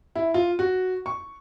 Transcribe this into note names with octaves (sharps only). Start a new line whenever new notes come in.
E4
F4
F#4
C#6